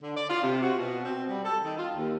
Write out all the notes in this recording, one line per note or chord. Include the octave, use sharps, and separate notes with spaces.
D3
D5
F4
C3
F#4
B2
C4
G3
A4
D#3
F4
D#2